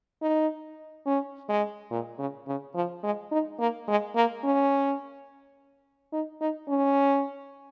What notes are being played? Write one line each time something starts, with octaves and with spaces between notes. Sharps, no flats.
D#4
C#4
G#3
A#2
C#3
C#3
F3
G#3
D#4
A#3
G#3
A#3
C#4
D#4
D#4
C#4